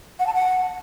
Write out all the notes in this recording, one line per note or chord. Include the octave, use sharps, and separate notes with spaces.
F#5
A5
F#5